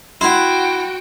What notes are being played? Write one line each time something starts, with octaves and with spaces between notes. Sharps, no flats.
E4 F#4 F#5 G5 C6